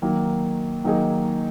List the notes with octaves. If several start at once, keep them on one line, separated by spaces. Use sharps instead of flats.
D#3 F#3 A#3
D#3 F#3 A#3 D#4 G#4